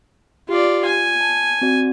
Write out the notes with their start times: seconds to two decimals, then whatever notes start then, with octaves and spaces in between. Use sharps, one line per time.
0.49 F4 G4 D5
0.85 G#5
1.21 A5
1.61 C4 F#4 D5